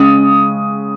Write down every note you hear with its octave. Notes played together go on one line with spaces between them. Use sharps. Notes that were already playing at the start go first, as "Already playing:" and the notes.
Already playing: C#3 G#3 C#4 D#6